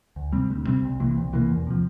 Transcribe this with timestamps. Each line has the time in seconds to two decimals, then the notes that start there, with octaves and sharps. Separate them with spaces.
0.16 D2
0.33 C3 G3 C4
0.50 D2
0.67 C3 G3 C4
0.82 C2
1.00 C3 E3 A#3
1.16 C2
1.33 C3 E3 A#3
1.50 E2
1.67 C3 F3